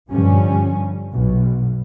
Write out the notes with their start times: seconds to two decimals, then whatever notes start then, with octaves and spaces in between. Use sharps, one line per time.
0.10 G2 D3 F3 G3 C#4
1.14 B1 B2